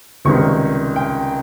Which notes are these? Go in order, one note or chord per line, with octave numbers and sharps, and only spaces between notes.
C#2 C3 D#3 G3 C4 C#6
G5